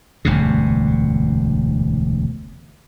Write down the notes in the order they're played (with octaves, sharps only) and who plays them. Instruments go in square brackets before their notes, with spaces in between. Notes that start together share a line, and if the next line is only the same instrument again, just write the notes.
[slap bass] E1 D2 G2 C3